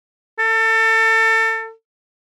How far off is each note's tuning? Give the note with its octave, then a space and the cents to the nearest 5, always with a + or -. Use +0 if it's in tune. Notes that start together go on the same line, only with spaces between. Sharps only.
A4 +30